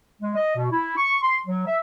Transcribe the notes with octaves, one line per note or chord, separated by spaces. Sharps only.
G#3
D#5
B2
E4
C#6
C6
F#3
E5